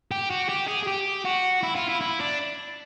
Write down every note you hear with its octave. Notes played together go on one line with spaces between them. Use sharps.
G4
F#4
G4
G#4
G#4
G4
F#4
E4
F4
E4
E4
D4